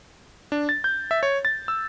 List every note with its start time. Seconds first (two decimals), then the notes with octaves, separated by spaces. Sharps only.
0.52 D4
0.69 A6
0.84 G6
1.11 E5
1.23 C#5
1.45 A6
1.68 E6